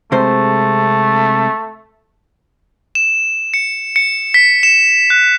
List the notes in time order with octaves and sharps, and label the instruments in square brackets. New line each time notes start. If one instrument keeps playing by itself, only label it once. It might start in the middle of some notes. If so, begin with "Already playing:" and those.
[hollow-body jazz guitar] C3 G#3 C5 [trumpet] A3
[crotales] E7
C#7
C#7
B6
E7
F#6